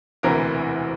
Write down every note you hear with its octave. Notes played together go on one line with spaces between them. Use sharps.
E1 D2 C3 E3 A#4